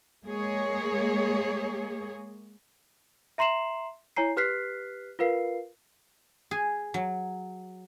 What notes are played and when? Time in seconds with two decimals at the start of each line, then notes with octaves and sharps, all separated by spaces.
0.24 G#3 A#3 G#4 C#5
3.38 E5 A#5 C6 C7 E7 F#7
4.16 E4 C#5 G#5 A#5 C7
4.36 G4 B4 F6 F#6 B6 C7
5.19 F4 A#4 B4 F5 C7
6.51 G#4
6.94 F#3